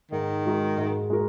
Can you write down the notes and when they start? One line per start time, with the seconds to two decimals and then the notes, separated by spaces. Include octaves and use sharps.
0.12 G#2 D#3
0.44 G#3 F#4 A#4
0.78 G#2
1.10 G#3 F#4 A#4